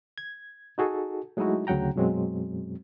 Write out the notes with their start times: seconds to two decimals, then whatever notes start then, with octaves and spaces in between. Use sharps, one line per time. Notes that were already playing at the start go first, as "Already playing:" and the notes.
0.18 G#6
0.78 D#4 F#4 G#4 A4
1.37 F#3 G#3 A3 D#4 E4 F#4
1.67 D2 C#3 F#3 F#5 G5 A#5
1.96 F#2 B2 F#3 G#3 C4